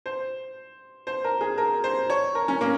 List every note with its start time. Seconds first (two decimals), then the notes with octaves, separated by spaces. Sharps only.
0.06 C5
1.07 C5
1.24 A#4
1.41 G#4
1.58 A#4
1.84 C5
2.10 C#5
2.35 A#4
2.48 C#4
2.61 A#3